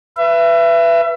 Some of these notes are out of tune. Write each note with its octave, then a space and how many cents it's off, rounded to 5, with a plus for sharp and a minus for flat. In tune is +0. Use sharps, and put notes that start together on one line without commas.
B4 +0 E5 +30